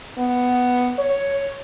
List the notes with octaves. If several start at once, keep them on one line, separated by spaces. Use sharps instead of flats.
B3
C#5